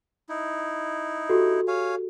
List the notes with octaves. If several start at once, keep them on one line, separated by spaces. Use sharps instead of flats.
D#4 E4
F#4 G4 A4
C#5 F5 G#5